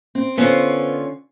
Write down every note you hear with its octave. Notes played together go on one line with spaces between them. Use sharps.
C4
D3 B3 C#4 F4 C5